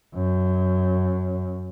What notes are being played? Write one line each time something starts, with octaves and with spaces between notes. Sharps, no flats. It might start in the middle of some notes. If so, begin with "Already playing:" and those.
F#2